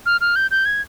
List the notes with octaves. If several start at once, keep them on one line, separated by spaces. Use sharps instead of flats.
F6
F6
G6
G6
G#6